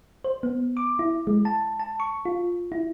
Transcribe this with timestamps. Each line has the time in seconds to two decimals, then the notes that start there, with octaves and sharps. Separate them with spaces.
0.24 C5
0.43 B3
0.77 D6
0.99 E4
1.27 G#3
1.45 A5
1.80 A5
2.00 C#6
2.25 F4
2.72 E4